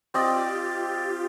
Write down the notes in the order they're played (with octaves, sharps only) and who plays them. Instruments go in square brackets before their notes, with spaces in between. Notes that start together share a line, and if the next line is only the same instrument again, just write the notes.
[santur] C4 D5 D#5 [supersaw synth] F4 G4